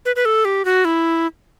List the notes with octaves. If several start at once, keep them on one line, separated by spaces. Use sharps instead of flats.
B4
B4
A4
G4
F#4
E4